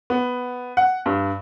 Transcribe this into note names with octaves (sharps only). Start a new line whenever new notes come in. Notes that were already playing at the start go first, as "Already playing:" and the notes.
B3
F#5
G2